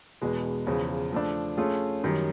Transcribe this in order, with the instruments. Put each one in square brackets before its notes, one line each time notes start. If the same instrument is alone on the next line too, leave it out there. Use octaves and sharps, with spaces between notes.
[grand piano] E2 B2 G#3
E2 C#3 F3
F3 A3 D4
A3 C#4 F4 G#4
F#2 D#3 G3